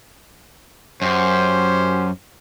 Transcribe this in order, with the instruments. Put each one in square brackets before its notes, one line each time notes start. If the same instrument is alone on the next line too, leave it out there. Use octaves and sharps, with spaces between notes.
[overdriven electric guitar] F#2 [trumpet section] C#4 G4 C5